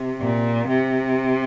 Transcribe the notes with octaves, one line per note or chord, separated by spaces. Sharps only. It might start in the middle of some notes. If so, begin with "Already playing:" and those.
Already playing: C3
A#2
C3